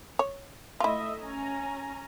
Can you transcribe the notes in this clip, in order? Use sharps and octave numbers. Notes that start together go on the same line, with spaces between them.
C#5
A3 E4 F4 D#5 E5
C#4 G#5 A#5